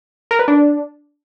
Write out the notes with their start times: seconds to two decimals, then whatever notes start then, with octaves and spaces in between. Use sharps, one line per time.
0.31 A#4
0.39 B4
0.48 D4